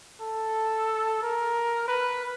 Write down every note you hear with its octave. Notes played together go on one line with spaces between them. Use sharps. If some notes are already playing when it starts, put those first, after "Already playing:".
A4
A#4
B4